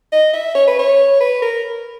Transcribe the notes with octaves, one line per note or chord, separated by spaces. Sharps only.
D#5
E5
C#5
B4
C#5
B4
A#4